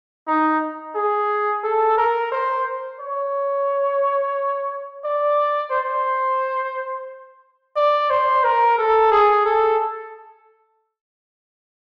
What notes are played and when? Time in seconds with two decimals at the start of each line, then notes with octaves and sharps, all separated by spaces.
0.28 D#4
0.95 G#4
1.64 A4
1.97 A#4
2.32 C5
2.99 C#5
5.04 D5
5.71 C5
7.76 D5
8.10 C5
8.44 A#4
8.78 A4
9.12 G#4
9.46 A4